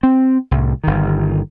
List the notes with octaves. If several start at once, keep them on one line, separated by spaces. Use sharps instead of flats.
C4
C2 A2
G1 D#3